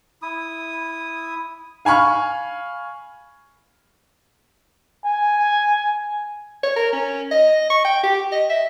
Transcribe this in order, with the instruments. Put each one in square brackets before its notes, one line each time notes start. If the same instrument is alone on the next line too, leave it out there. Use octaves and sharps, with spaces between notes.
[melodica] E4 D#6
[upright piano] F5 G#5 B5 C#6 F6
[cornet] G#5
[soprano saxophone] C#5
A#4
C#4
D#5
C#6
G5
G4
D#5
E5